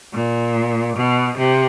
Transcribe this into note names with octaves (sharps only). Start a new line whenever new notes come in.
A#2
B2
C3